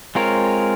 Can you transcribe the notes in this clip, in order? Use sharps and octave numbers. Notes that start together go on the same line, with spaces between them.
G#3 C4 F4 A#4 C#5